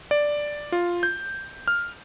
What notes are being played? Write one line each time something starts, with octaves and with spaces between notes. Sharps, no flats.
D5
F4
G6
F6